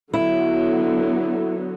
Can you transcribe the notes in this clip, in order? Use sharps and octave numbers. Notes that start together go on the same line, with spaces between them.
D3 F#3 B3 E4